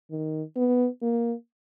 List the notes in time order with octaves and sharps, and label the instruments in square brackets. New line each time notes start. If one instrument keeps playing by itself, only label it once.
[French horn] D#3
B3
A#3